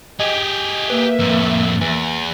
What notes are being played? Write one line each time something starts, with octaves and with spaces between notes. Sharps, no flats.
G4 G#4 D#5
A#3 B4 E5
F2 A2
E2 E3